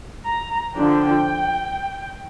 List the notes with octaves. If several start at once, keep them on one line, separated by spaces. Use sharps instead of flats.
A#5
D3 F3 D4 G5